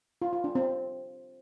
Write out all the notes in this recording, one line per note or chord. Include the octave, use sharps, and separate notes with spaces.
F4
F4
D4
C4